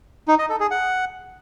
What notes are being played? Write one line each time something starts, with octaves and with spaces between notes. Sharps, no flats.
D#4
D#5
A4
G#4
F#5